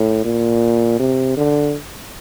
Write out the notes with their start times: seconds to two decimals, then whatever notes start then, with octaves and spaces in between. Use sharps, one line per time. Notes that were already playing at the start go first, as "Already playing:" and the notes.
Already playing: A2
0.25 A#2
0.99 C3
1.37 D3